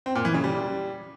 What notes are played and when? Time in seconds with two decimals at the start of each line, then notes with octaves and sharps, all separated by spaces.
0.06 C4
0.15 A#2
0.25 E3
0.34 C#3
0.44 G3